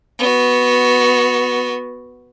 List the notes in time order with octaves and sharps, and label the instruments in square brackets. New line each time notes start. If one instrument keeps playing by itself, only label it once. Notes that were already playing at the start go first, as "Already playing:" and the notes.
[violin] B3 F#4